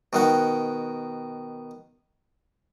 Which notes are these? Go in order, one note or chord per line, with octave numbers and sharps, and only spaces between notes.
B2 D#3 F#5